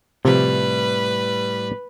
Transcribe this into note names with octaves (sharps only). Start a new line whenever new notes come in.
A2 C3 F3 G3 B4